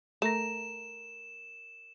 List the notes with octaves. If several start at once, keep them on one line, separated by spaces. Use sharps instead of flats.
A3 A#4 A#5 A#6 E7